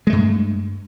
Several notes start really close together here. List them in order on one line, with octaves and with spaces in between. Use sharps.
G#3 A3 G2